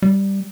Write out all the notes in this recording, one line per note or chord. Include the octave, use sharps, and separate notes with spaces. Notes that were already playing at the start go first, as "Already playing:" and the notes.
G3